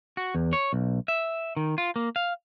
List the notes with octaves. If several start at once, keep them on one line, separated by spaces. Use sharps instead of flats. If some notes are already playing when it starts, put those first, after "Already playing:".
F#4
E2
C#5
B1
E5
D#3
F4
A#3
F5